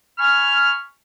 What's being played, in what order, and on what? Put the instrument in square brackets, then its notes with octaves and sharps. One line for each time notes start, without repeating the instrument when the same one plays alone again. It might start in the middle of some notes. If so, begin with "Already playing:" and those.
[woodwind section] G#5 B5 C#6 F6